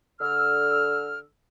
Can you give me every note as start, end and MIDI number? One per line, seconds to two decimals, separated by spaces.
0.21 1.20 50
0.21 1.20 88
0.21 1.20 89